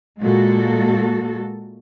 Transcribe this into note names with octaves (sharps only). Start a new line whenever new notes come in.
A#2 G#3 A#3 F#4 A4